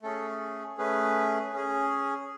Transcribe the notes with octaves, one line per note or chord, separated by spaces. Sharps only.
A3 C#4 G#4 A4
A3 C#4 G#4 B4
C#4 G#4